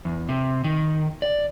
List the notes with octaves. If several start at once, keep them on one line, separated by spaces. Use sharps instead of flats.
E2
C3
D#3
D5